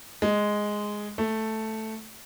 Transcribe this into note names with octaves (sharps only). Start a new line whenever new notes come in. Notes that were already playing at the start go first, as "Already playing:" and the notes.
G#3
A3